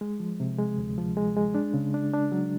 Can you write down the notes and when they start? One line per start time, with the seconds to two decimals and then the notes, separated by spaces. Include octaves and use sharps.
0.01 G#3
0.20 F3
0.40 C3
0.59 G#3
0.78 D2
0.98 F3
1.17 G#3
1.36 G#3
1.55 D4
1.74 C#3
1.94 D4
2.13 D4
2.32 F#3